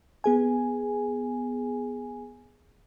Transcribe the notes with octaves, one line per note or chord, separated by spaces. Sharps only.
B3 G#4 G#5